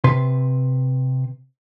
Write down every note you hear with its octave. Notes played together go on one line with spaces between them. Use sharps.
C3 B4 C6